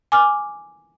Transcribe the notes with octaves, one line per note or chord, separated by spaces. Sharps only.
G#5 D6 F6